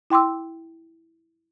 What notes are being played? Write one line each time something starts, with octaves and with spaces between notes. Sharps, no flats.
E4 G5 C6 D6 E6